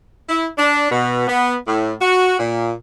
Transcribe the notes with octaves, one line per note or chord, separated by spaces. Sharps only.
E4
D4
B2
B3
A2
F#4
A#2